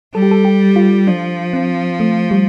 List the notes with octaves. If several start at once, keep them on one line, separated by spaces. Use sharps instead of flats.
G3 A4
G4
A4
G4
F4
F3 D4
C4
A3
G3